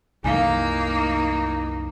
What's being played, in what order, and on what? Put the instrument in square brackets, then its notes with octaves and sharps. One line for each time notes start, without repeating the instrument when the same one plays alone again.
[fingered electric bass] C2 F#2 E3 [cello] A#3 [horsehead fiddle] D#4 [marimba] F5 G#5